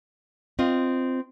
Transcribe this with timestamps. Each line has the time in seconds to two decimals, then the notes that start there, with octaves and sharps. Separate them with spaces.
0.59 C4 F4 D#5